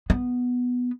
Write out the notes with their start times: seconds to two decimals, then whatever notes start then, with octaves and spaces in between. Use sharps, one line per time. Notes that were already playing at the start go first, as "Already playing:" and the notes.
0.10 B3